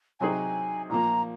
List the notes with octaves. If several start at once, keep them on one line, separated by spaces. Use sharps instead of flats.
C3 F#3 C4 D#4 G#4 G#5
A#2 F3 A#3 A#5